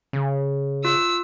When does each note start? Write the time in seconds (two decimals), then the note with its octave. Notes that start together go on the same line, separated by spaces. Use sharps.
0.13 C#3
0.85 F4 E6